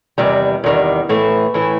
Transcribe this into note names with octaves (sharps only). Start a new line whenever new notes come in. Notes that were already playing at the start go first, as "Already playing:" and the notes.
E2 C3 D#3 G3
E2 C3 D#3 G3
A2 E3 A3 E4
A2 E3 A3 E4